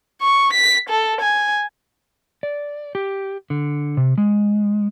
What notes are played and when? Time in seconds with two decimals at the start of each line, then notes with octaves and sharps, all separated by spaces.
0.22 C#6
0.53 B6
0.89 A4
1.21 G#5
2.43 D5
2.95 G4
3.50 D3
3.97 C3
4.18 G#3